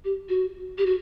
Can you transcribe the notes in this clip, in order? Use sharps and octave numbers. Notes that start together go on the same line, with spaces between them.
G4
F#4
G4
F#4